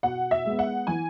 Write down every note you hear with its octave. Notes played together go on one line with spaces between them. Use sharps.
B2 F#5
E5
G#3 B3
F#5
E3 G#5